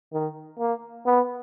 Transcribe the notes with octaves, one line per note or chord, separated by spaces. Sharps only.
D#3
A#3
B3